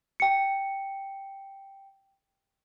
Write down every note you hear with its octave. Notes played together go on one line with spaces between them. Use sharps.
G5 C#7